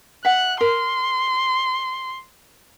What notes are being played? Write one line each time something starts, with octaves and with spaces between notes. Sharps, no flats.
E5 F#5 F#6
A#4 C6